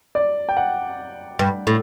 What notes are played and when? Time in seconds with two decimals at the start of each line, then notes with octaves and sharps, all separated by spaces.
0.15 D5
0.49 G5
0.57 F#5
1.39 G2
1.67 A2